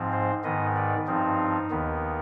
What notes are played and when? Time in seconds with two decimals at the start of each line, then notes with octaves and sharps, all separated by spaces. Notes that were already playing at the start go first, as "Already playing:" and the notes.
Already playing: G#2 F3 C4
0.12 C5
0.44 G#2 D#3 B3 D#5
0.76 D5
1.07 G2 F3 C4 D#4
1.71 D#2 D#3 B3